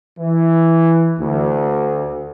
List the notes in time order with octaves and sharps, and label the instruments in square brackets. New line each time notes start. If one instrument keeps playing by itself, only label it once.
[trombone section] E3
D2